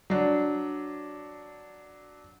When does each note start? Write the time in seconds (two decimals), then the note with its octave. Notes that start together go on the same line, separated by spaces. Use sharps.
0.10 F#3 D4